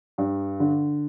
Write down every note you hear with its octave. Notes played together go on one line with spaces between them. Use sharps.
G2
D3